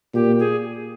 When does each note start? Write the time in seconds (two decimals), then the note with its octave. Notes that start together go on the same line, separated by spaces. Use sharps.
0.14 A#2 G4
0.39 G#4